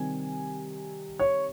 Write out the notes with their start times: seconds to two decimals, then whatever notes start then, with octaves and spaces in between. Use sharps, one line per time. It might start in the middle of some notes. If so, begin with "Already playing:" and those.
Already playing: C3 D#3 G3 G#5
1.19 C#5